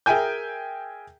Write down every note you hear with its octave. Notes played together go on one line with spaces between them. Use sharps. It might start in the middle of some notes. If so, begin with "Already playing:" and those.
G#4 A#4 E5 G5 G#5 G6